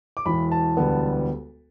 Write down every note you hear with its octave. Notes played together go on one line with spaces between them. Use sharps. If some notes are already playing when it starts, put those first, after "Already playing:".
D6
E1 E2 E3 B5
A5
E1 D2 D3 G3 B3